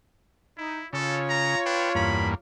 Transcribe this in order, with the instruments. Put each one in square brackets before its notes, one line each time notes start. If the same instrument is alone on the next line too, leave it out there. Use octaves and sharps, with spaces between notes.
[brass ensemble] D#4 [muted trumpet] E4
[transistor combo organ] C#3 [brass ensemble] F4 C#5 [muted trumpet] A4
[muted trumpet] A#5
[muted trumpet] D4 [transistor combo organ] B4 G5
[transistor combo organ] E2 G2 A#3 [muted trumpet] B5